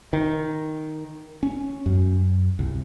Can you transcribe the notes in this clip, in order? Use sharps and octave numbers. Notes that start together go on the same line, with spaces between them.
D#3
C#4
F#2
C2